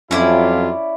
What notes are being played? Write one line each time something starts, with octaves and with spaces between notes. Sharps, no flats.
F2 F#3 C#4 E4 F4 D5